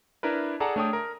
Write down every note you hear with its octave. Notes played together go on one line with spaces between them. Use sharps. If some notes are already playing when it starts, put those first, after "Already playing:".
D4 E4 A#4 B4
G#4 A4 D5 F#5 A5 A#5
A3 D4 C#5 G5 D#6
A#4